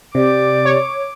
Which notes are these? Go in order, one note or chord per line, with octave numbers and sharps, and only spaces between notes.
C3 G4 D5 D6
C#5